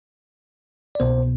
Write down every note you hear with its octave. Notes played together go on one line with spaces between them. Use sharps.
D5
C2 B2 B3 C5